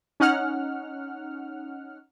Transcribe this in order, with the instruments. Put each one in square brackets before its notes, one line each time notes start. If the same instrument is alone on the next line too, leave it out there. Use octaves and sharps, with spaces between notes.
[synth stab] C#4 D#4 F#5 F6